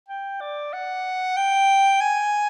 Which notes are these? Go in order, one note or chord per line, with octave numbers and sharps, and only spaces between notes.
G5
D5
F#5
G5
G#5